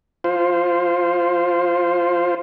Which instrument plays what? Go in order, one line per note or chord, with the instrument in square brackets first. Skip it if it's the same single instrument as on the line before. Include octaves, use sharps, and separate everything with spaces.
[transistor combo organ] F4 C5